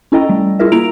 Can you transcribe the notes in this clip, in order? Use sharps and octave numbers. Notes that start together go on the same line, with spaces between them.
C#4 E4 A4 D#5 G5 A#5
G3 A3
E4 F4 G#4 A#4 E5
A#3 E4 A#5 D7 F7